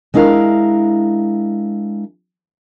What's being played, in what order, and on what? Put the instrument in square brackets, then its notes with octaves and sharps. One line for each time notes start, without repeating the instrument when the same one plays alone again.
[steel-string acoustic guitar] G#3 D4 E4 A#4 F5